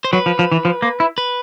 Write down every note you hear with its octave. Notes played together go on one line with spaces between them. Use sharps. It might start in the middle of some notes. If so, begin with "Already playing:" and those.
C5
F#3 B4
F3
F3
E3
F3
A#3
E4
B4